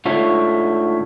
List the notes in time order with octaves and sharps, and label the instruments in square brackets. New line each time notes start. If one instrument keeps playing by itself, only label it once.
[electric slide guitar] G#2 D3 A3 F4 C#5